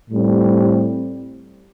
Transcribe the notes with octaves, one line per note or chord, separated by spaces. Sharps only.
A2 G3 C4